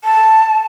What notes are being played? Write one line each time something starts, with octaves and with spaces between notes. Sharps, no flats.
A5